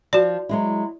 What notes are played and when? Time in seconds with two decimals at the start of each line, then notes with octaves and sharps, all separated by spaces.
0.13 F3 F#4 D5
0.49 F#3 G#3 E4